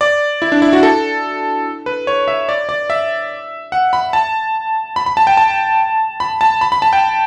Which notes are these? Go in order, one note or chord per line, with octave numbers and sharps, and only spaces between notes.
D5
E4
D4
E4
F#4
A4
B4
C#5
E5
D5
D5
E5
F#5
B5
A5
B5
B5
A5
G5
A5
B5
A5
B5
B5
A5
G5